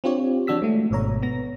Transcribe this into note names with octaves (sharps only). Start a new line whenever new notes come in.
C4 D4 F4 G4 C#5
E3 F3 D4 F#4 E6 B6
G#3 A3
G#1 B2 C#5 A#5
B3 A#6